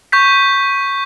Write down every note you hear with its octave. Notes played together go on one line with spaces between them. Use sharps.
C#6 G6 B6